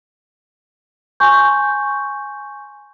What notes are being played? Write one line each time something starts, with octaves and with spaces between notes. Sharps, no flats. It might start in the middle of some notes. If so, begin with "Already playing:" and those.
G#5 C6 C#6 G6